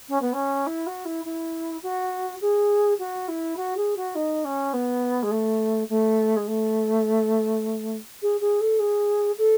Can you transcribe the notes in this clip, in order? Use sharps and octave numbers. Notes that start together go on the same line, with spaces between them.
C#4
B3
C#4
E4
F#4
E4
E4
F#4
G#4
F#4
E4
F#4
G#4
F#4
D#4
C#4
B3
G#3
A3
A3
G#3
A3
G#4
G#4
A4
G#4
A4